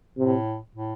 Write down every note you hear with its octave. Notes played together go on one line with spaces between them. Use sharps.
A2 C3
A2